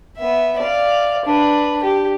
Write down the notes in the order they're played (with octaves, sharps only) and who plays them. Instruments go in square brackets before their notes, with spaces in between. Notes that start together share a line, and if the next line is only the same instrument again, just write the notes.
[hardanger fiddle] B3 E5
D5 F5
D4 B4
G4